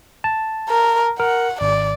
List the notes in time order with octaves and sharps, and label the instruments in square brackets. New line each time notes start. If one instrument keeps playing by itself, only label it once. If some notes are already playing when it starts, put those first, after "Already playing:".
[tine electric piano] A5
[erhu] A#4
[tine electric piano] A#4 [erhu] F#5
[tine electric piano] G#1 [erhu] D5